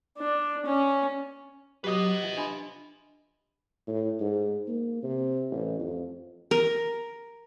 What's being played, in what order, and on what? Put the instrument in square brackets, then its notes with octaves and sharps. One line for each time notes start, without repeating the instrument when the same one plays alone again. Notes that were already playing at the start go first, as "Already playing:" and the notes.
[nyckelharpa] D4
C#4
[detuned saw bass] F#3 [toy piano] G4 D6 D#6 [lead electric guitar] B4 D#5
[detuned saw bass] F3 [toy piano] E5
[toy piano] D4 B5 C6
[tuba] A2
G#2
A#3
C3
A1
F2
[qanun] A#4